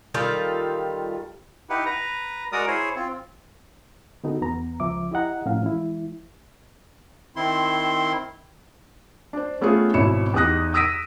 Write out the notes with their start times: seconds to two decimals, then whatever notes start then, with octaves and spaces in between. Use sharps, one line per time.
0.14 D#3 G3 F4 A4
1.70 D#4 E4 G4 B4 F#5
1.86 B4 A#5
2.52 G#3 F#4 A#4 D5 A#5 D#6
2.67 E4 G#4 C5 C#5
2.96 C4 F4
4.24 D3 B3 D#4 F#4 G4 A4
4.42 E2 B3 A#5
4.80 C#2 F3 E5 D6
5.11 E4 G4 D#5 F#5 A#5
5.46 A2 F3 C#4 F5
5.62 E3 G#3 E4
7.36 D#3 C4 E4 C6
9.33 D4 C5
9.61 A3 B3 C#4 F4 G#4
9.94 G#1 B2 E4 C#5 C#7 E7
10.34 E2 D#4 G4 D#6 F#6 A#6
10.74 D#6 E6 A#6 B6 D7 D#7